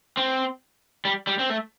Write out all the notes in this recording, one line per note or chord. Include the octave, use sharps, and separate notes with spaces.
C4
G3
G3
C4
A3